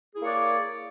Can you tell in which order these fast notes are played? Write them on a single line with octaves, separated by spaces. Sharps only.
G#4 E4 A#3 C#5 D5